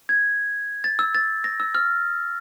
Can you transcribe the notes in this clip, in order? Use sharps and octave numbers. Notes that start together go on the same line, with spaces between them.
G#6
A6
E6
A6
A#6
E6
F6